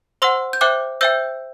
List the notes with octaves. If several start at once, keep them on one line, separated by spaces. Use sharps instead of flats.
C5 F#5 C6 E6
G6
C5 E5 G5 D6 F#6
C5 E5 G5 E6 G6